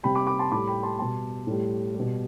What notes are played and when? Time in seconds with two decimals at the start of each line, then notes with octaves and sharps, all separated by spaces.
0.03 C3 G3 G5 B5
0.15 B5 D6
0.27 B5 D6
0.39 A5 C6
0.51 A2 G3 B5 D6
0.67 G5 B5
0.83 A5 C6
0.98 B2 G3 A5 C6
1.47 A2 G3
1.94 G3
1.99 B2